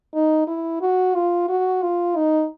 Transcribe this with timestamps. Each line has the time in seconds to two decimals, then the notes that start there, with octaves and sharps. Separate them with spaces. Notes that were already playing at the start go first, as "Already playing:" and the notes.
0.14 D#4
0.47 E4
0.81 F#4
1.15 F4
1.49 F#4
1.82 F4
2.16 D#4